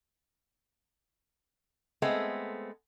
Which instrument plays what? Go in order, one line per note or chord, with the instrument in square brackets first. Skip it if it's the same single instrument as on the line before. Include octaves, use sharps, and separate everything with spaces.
[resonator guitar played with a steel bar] G#3 A3 B3 C4